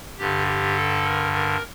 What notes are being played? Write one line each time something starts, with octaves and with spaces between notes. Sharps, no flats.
G2 D3 G4
G4
A4
A#4
A#4